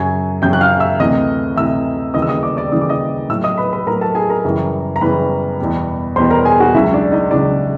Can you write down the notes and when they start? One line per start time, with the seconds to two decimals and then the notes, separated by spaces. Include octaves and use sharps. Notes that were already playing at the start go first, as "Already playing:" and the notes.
Already playing: F#2 C#3 F#3 G#5 G#6
0.42 F#2 C#3 F#3 G5 G6
0.53 F#6
0.61 F5 F6
0.80 E5 E6
0.99 D2 C3 E3 D#5 D#6
1.56 D2 C3 E3 E5 E6
2.14 D#2 C#3 E3 G3 D#5 D#6
2.22 E6
2.29 D#5 D#6
2.43 D5 D6
2.57 D5 D6
2.72 D#2 C#3 E3 G3 D#6
2.82 D6
2.89 D#5 D#6
3.29 A2 F#3 E5 E6
3.43 D#5 D#6
3.58 B4 B5
3.73 B4 B5
3.86 A2 F#3 A#4 A#5
4.01 A4 A5
4.15 G#4 G#5
4.30 A#4 A#5
4.45 F#2 C#3 E3 G3
4.96 A#5
5.01 F#2 C#3 E3 G3 B4 B5
5.60 E2 B2 G3
6.16 E2 B2 G3 C5 C6
6.30 A#4 A#5
6.45 G#4 G#5
6.60 F#4 F#5
6.74 C#2 C#3 F#3 E4 E5
6.93 D4 D5
7.12 D#4 D#5
7.31 C#2 C#3 F#3 D4 D5